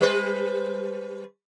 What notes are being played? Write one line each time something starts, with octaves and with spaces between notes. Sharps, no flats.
G3 B4 C5